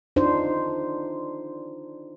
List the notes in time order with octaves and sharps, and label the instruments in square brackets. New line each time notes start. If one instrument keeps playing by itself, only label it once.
[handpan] D4 D#4 F4 C5